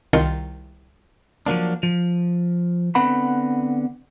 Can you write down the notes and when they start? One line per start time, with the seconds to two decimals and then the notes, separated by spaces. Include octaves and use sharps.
0.13 C2 D#3 F4 C6 C#7
1.46 F3 F#3 A#3 D4
1.83 F3
2.95 D3 B3 C4 B4 F#5 B5